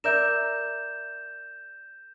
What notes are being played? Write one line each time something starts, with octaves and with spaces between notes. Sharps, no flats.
A#4 D5 E5 G6 E7